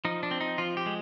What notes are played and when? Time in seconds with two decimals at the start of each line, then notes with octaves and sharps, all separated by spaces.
0.05 F3 D#4
0.23 D4
0.31 C4
0.41 D#4
0.58 F3 F4
0.77 G4
0.86 G#3